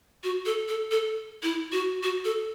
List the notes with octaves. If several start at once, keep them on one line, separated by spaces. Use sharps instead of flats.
F#4
A4
A4
A4
E4
F#4
F#4
A4